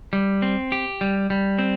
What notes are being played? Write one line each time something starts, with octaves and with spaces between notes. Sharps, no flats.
G3
C4
G4
G3
G3
C4